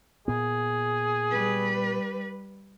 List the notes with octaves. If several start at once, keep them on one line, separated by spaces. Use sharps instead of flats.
A#2 B3 G#4
G3 B4